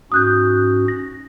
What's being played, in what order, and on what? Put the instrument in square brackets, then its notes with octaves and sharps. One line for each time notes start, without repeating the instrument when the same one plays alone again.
[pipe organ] G#2 C#4 F#4 [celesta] D#6 F#6 G6
[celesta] A#6